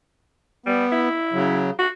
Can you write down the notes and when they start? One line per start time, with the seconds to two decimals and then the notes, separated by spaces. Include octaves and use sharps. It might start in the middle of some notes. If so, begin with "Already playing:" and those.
0.66 G3 B3
0.92 E4
1.33 C#3 F#3
1.79 F#4